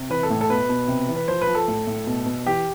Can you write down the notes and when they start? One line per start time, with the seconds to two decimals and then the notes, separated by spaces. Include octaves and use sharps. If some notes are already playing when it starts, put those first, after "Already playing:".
Already playing: C3
0.10 E3 B4
0.23 A4
0.30 A2
0.41 A4
0.50 B2 B4
0.69 B2
0.88 C3
1.09 E3
1.16 B4
1.28 F3 C5
1.41 B4
1.47 F3
1.55 A4
1.68 A2
1.87 A2
2.07 B2
2.26 B2
2.46 E3 G4